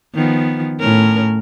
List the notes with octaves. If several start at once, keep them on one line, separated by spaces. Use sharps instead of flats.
D#3 F3 B3
A2 C#4 A#4